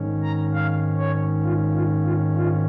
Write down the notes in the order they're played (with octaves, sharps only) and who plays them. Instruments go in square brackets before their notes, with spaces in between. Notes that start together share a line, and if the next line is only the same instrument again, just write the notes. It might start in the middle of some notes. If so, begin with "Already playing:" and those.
Already playing: [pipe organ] G#2 D#3 C#4
A#5
F5
C#5
F4
F4
F4
F4